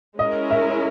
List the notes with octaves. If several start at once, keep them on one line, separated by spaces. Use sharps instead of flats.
G#3 C#4 E4 A#4 D#5
E5